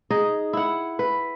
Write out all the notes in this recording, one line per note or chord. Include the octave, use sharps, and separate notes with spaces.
D#4 G#4 D#5
E4 F#5
B4